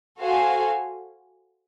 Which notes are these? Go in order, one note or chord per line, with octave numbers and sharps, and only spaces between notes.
F#4 A4 C5 F5 G#5